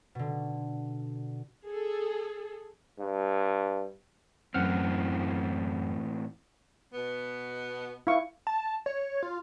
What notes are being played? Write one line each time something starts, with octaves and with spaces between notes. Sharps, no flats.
B2 D3
G#4 A4
G2
F#2 A2 E3 C4 F#5 F6
B2 B3
E4 F5 C#6
A5
C#5
F4